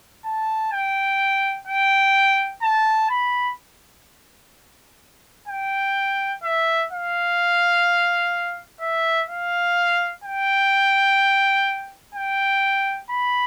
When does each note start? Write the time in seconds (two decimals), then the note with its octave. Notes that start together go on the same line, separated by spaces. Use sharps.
0.25 A5
0.73 G5
1.68 G5
2.62 A5
3.10 B5
5.48 G5
6.43 E5
6.92 F5
8.81 E5
9.29 F5
10.24 G5
12.15 G5
13.10 B5